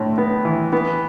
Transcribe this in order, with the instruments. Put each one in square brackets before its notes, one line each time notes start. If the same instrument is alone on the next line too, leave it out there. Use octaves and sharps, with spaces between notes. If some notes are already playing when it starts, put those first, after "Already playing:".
Already playing: [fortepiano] A2 D4
B3
E3
B3